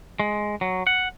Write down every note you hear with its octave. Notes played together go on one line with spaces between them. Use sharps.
G#3
F#3
F#5